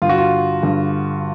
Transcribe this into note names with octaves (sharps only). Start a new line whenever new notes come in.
G2 D3 F4
F#4
F4
G2 D3